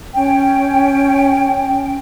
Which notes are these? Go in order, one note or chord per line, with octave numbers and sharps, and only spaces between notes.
C#4 G5